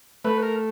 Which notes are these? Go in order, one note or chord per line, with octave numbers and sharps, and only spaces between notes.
A3 B4
A#4